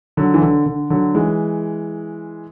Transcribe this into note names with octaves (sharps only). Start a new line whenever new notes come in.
D3 F#3
E3
D3
D3
D3 F#3
E3 G#3